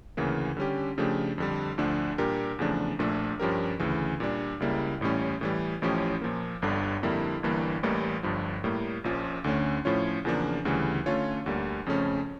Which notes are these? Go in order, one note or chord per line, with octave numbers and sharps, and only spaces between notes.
D2 C#3 E3 A#3
D3 G3 C#4 G4
C#3 F3 A3 D4 G4
F2 D3 G3
D2 D3 F3 A3 D4
A#2 G3 D4 G4 A#4
E2 C#3 F3 A3 D4
A#1 A#2 A3 D4 A4
G2 F3 C#4 G4 A#4
D2 C#3 E3
A#2 G3 D4
C#2 C#3 G3 A#3 E4
A1 A2 G3 C#4
A2 E3 G3
A1 A2 F3 C#4 G4
A#2 F3 A#3
G1 G2 D3 G3
F2 D3 G3 A#3 E4
G1 G2 E3 A#3
A1 A2 E3 G3 A#3
G1 G2 F3
A2 G3 A#3
A#1 A#2 F3 C#4
D2 D3 A3 C#4
A2 F3 C#4 F4 C#5
E2 C#3 F3 A#3 D4
D2 C#3 E3 G3
D3 A3 C#4 F4 C#5
D2 D3 G3 A#3
F2 C#3 F3 A3 C#4